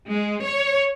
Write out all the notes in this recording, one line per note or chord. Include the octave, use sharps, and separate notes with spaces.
G#3
C#5